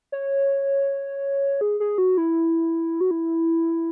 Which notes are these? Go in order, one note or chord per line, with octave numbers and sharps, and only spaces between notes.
C#5
G#4
G#4
F#4
E4
F#4
E4